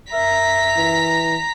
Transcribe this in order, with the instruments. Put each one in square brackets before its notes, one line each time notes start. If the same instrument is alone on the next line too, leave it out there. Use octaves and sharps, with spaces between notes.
[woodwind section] F#2 A#4 E5 [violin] A#5 B6
[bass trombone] E3